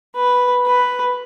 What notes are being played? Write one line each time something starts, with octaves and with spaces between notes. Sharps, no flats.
B4
B4